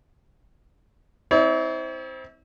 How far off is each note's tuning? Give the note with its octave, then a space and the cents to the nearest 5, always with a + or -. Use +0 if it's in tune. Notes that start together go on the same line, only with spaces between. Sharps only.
C4 +0 E4 -40 C#5 +45